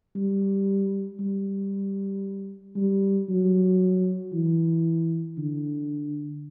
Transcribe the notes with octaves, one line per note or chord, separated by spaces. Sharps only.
G3
G3
G3
F#3
E3
D3